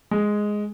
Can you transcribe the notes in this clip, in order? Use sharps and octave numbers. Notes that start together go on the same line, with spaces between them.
G#3